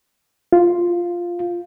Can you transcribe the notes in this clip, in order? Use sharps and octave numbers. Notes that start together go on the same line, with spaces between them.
F4